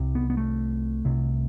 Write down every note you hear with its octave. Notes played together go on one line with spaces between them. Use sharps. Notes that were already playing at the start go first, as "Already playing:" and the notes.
Already playing: C2 C3
B3
B3
A3
C2 C3